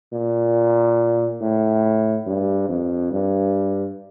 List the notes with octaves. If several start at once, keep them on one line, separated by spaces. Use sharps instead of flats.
A#2
A2
G2
F2
G2